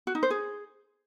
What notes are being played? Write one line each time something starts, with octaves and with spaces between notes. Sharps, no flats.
F#4
D#4
C5
G#4